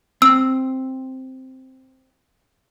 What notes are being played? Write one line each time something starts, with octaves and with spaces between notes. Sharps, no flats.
C4 E6